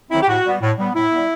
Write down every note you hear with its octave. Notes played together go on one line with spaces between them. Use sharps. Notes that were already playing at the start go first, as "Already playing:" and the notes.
D#3 F#3 C4 E4
G4
A2 F#4
G3 B3
A2
G3 B3
A2 E4
G3 B3